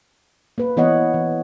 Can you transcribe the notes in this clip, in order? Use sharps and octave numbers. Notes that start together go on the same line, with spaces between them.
A#3 B4
E3 B3 C#5 D#5 F#5
E3